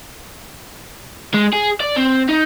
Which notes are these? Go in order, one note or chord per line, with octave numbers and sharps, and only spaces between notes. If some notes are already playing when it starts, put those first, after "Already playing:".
G#3
G#4
D5
C4
D#4